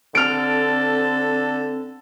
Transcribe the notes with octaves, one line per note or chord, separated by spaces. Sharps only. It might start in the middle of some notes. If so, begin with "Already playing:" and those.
D3 C4 A4 F6 D7